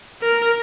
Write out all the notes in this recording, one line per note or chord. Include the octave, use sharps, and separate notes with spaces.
A#4